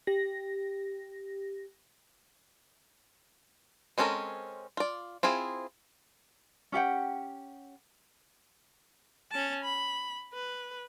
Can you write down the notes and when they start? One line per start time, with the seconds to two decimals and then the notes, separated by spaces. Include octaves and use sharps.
0.07 G4 A#6
3.98 G#3 C4 C#4 A4 A#4
4.77 F4 D5
5.23 C4 E4 F4 G#4
6.72 C#4 G4 F#5 G5
9.32 C#4 A5
9.65 B5
10.33 B4